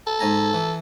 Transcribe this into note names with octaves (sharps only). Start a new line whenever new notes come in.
A4
G#2 G#5 A#5
E3